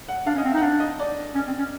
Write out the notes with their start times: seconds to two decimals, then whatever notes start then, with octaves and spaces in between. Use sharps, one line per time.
0.09 F#5
0.27 D4 F5
0.35 C#4
0.38 D#5
0.45 C4
0.51 E5
0.54 D#4
0.57 F#5
0.62 D4 F5
0.80 D#5
0.99 D5
1.35 C#4
1.47 C4
1.59 C#4